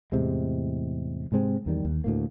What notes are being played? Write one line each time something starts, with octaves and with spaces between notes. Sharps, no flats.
E2 A2 C3 G#3
G#2 C3 G#3 C4
E2 D#3 G3
D#2
D2 A2 A#3